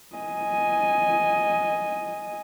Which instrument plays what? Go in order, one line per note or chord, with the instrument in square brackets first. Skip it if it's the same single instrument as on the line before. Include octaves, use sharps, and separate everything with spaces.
[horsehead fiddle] D#5 G#5